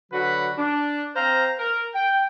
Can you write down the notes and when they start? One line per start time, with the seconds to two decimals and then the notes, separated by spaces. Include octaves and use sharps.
0.12 D3 F#3 F#4 B4
0.58 D4
1.16 C4 C5 F5 A#5
1.59 A#4
1.94 G5